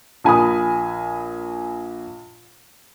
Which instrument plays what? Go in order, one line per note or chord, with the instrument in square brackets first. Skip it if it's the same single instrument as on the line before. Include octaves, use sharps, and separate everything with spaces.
[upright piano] A#1 G#5 B5 D#6